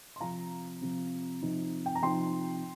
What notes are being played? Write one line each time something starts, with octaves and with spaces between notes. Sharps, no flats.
C6
C3 F3 C4 F5 A#5
C3 F3 C4
C3 F3 D#4
G5
A#5
C3 F3 D#4 G5 C6